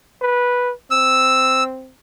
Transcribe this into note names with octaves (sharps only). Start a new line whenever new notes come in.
B4
C4 E6